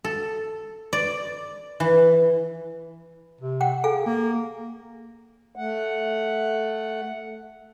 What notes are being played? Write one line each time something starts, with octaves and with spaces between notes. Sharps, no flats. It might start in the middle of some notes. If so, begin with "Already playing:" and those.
A4
D5
E3
C3
F#5 G5
G#4 A4 F5 G#5
A#3
A3 F#5